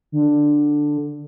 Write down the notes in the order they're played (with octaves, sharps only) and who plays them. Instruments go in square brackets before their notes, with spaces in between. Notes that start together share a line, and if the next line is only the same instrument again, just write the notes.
[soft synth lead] D3